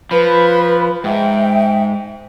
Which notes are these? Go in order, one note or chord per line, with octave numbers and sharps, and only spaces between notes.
F3 B4 B5
G#2 E5 G5